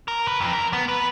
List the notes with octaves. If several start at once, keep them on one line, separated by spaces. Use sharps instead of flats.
A#4
B4
F2
A#4
B3
B4